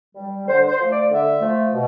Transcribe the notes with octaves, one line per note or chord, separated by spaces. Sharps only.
G3
D3 C5
C5
F3 A3
D5
D3 E5
F3 A3
B2